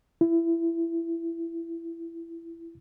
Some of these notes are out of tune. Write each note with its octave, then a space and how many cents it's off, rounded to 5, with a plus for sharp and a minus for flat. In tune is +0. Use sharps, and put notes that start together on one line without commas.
E4 +20